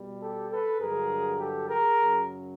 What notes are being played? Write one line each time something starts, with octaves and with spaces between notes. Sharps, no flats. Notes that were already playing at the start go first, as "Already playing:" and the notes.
Already playing: B2 G3
G4 A4
A4 B4
G2 D3 F#3 G#4 A#4
G4 A4
G#4 A#4
F#2 C#3 F#3